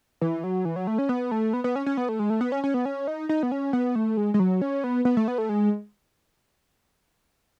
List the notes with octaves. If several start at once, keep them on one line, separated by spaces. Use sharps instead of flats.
E3
F#3
E3
F#3
A3
C#4
B3
A3
B3
B3
C#4
C#4
B3
A3
G#3
A3
B3
C#4
C#4
B3
C#4
D#4
D#4
B3
C#4
B3
A3
G#3
G#3
F#3
C#4
B3
B3
A3
B3
A3
G#3